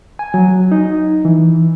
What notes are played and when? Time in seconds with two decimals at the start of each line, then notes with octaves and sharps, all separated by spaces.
0.19 G#5
0.34 F#3
0.72 D#4
1.25 E3